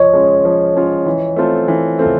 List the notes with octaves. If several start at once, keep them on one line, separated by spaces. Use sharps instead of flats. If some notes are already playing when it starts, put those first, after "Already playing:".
Already playing: F3 C#5 D#5
G#3 C#4 F4
F3
G#3 C#4 F4
E3
A3 C4 F4 A4
E3
A3 C4 F4 A4